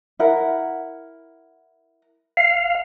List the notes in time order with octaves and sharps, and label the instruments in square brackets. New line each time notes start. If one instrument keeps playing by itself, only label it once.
[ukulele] E4 A#4 F#5
[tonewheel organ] F5